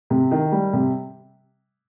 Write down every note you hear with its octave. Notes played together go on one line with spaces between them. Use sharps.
C3
D#3
G3
C3